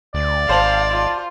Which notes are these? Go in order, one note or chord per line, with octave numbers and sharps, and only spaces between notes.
D2 D5
G#1 C5 F5 A5 F#7
F4